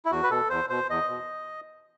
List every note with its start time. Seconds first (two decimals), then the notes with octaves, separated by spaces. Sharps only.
0.05 E4
0.11 E2 F#4
0.23 B4
0.31 B2 A4
0.50 E2 C5
0.70 B2 C5
0.89 E2 D#5
1.09 B2